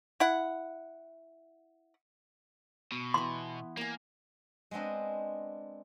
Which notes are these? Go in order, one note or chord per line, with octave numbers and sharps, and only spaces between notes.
E4 F#5
B2
E3 B3 C6
A#3 D5 G#5
G#3 B3 C4 D4 D#5